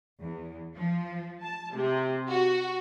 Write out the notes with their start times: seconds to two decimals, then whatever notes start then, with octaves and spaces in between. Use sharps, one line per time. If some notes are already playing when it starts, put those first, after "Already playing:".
0.21 E2
0.76 F3
1.42 A5
1.75 C3
2.28 F#4